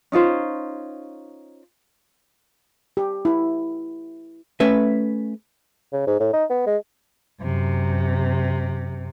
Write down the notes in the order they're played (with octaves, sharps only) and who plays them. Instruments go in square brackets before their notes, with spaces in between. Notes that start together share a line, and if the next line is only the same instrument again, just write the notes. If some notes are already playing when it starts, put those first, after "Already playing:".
[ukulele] C#4 D#4 F4 C5
[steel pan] G4
E4
[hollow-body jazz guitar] A3 C#4 B4 E5
[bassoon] C#3
G#2
A2
D#4
B3
G#3
[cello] F#2 C3